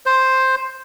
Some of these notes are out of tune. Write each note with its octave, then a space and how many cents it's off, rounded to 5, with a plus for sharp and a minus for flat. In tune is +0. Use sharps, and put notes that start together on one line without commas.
C5 +5